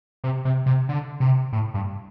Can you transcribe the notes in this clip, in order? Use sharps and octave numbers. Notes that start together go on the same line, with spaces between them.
C3
C3
C3
D3
C3
A2
G2